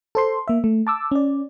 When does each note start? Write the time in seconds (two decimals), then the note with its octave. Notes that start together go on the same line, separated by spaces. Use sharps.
0.15 A4 C5 C6
0.48 A#3 E5
0.64 A3
0.87 A5 D6 E6
1.12 C#4 D5